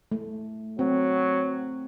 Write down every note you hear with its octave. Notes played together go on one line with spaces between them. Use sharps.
A3
F#3 C4